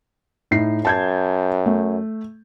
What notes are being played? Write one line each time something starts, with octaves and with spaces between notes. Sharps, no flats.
A2 D#4 C7
F#2 A5 G6 G#6
A3